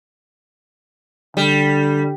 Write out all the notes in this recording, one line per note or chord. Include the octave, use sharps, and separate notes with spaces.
D3 G3